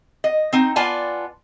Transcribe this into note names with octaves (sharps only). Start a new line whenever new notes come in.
D#5
C4 D#4
B3 F4 D5 G#5 A5